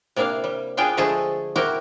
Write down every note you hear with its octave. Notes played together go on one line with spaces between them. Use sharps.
C3 A#3 D4 E4 F5
G3
B3 D4 F4 G4 G#4 G5
D3 F3 G#3 A3 G#4 A4
C4 E4 F#4 G4 A#4